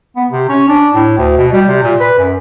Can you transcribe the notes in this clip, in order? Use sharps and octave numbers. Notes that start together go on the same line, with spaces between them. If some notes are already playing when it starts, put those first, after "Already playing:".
B3
C3
C#4
D4
A2
D2
B2
G3
C3
A#2
B4
F#2